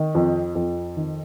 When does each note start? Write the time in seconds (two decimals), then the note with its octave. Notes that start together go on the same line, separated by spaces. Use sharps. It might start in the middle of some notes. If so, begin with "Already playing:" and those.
Already playing: D#3
0.15 F2
0.55 F2
0.97 D#3